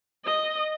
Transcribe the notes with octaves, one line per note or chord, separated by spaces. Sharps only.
D#5